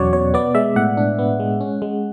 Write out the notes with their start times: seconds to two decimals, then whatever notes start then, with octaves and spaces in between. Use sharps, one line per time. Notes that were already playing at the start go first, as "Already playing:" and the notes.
Already playing: E2 B2 F#3 C#4 C#5 D5 F#5
0.13 B2 C#5
0.34 B3 D5
0.55 G#3 E5
0.76 A2 F#5
0.97 D4
1.19 B3
1.40 G#3
1.61 C#4
1.82 G#3